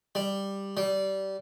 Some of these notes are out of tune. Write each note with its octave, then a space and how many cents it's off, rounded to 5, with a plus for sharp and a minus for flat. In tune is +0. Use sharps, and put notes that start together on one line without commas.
G3 +5
G3 -20